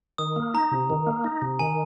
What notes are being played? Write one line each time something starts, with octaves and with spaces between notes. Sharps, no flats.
D#3 D#6
A#3
D#4 A#5
C3
D#3
A#3
D#4
C3
D#3 G#5